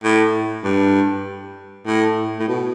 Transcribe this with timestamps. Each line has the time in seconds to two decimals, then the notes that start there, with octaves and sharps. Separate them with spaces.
0.04 A2
0.64 G2
1.86 A2
2.39 A2
2.48 B2